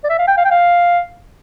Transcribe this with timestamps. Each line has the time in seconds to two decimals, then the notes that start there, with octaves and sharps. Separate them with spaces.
0.04 D5
0.09 E5
0.19 F5
0.28 G5
0.37 F5
0.45 G5
0.51 F5